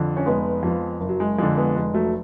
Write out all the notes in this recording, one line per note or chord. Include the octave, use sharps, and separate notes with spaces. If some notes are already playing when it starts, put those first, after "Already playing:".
Already playing: F2 D3
C#4
F1 G#3 B3
F2 F3
F#1
F#3
G#3
F2 D3 G#3
G#3 B3
F1 G#3
F#3 A3